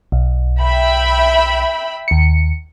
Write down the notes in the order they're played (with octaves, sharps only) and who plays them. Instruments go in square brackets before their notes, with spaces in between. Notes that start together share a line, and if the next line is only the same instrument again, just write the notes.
[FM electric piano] B1
[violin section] E5 G5 B5
[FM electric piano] D#2 C#7